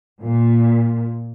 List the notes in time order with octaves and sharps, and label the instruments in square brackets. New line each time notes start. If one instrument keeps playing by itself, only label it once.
[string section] A#2